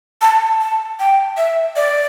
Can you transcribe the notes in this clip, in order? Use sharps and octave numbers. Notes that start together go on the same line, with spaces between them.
A5
A5
G5
E5
D5